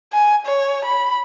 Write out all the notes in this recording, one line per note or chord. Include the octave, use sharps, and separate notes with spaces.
G#5
C#5
B5